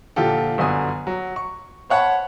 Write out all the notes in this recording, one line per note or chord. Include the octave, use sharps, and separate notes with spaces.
A#2 D3 F3 F4 G4 A4
G1 F#2 D3 G#5 D#6
F#3
C#6
C5 C#5 F#5 A5 B5 C#6